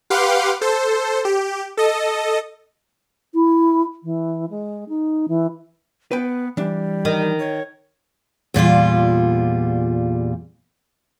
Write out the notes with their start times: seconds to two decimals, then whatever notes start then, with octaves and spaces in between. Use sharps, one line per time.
0.10 G4 B4 F5 F#5 C6 D6
0.61 A4 C5
1.25 G4
1.77 A4 D#5
3.34 E4
4.03 E3
4.50 G#3
4.89 D#4
5.28 E3
6.11 B3 B4 G5
6.57 E3 G3 D4
7.05 D#3
7.39 C#5
8.54 E2 A#2 G3 F4